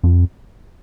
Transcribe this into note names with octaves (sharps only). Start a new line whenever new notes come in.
F2